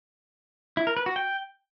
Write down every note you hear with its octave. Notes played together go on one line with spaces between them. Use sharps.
E4
A#4
B4
F#4
G5